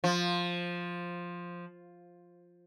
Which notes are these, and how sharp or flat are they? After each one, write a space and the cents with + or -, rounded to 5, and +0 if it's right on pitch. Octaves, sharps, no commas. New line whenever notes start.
F3 +5